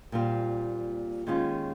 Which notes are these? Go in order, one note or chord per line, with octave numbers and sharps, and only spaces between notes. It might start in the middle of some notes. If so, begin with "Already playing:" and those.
A#2 G3 C4 F4
D#2 D#3 G#3 C#4 F4